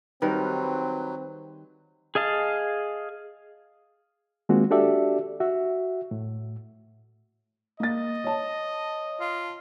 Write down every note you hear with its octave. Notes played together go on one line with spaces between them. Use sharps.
D#3 F#3 G3 C4 A#4 B4
G#4 D#5 F5 A5
D#3 G#3 A#3 C4 F4 F#4
D4 F#4 G4 A4 D5 E5
F#4 E5
A2
A#3 D#5 A6
C#5 A5
F4